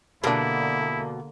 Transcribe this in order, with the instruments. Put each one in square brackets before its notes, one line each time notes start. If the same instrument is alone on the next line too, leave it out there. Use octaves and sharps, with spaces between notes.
[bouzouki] B2 [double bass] D3 A#3 [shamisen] G3 D4 [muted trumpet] E4